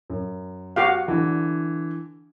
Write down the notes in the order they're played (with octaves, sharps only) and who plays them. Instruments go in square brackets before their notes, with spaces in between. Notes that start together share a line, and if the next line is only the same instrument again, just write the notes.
[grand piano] F#2
[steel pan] F#4 G4 F5
[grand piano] D3 E3 D4